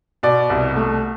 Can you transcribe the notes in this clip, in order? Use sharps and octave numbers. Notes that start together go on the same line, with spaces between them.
B2 D5
C2
A3